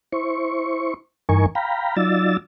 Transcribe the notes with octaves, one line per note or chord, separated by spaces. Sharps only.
E4 C5 C#6
G2 E3 D#4 A#4 G#5 C#6
F5 G5 A#5 B5
F#3 D#4 F4 D5 E6 A6